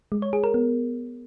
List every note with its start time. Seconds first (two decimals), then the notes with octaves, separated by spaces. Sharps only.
0.12 G#3
0.22 C#5
0.33 G#4
0.44 A#4
0.54 B3